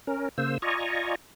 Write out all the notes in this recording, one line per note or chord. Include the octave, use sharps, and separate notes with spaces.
C#4 A#4
C#3 A#3 C5 E6
F4 D5 D#5 G#5 A#5 C#6